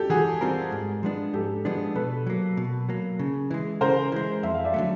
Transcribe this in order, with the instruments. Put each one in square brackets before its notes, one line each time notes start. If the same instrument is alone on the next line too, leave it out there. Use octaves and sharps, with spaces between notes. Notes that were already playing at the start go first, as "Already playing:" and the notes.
Already playing: [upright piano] G4 A4
[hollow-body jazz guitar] E3 [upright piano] F#4 G#4
[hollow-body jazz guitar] G3 C4 F4 A#4
G#2
F3 G#3 B3 D4
[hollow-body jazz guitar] G#2 [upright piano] G4 A4
[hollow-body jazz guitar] F3 G#3 B3 D4
[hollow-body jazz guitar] B2 [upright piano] A4 B4
[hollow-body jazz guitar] F#3 A#3
B2
F#3 A#3
C#3
E3 G#3
[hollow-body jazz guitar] C#3 [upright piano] A#4 C5
[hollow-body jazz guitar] E3 G#3
[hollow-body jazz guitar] F2 [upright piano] E5
[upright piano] F5
D5 E5
[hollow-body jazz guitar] D3 F#3 A3